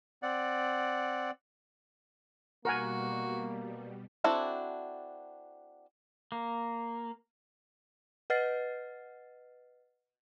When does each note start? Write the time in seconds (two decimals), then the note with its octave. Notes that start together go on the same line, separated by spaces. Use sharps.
0.23 C4 D5 F#5
2.65 B2 G3 A#3 F#4 A#4 F#5 G#5
4.24 C4 D4 E4 F#4 A4
6.32 A#3
8.30 B4 D#5 F#5 F6 A6 C7